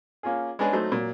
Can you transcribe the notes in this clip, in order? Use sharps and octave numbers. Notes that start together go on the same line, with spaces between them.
A#3 C#4 F4 G#4
G#3 B3 C#4 D4 G#4 B4
F#3 A3 D#4 C5
A#2 F#3